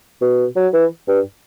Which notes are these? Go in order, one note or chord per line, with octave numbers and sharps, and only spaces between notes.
B2
F#3
E3
G2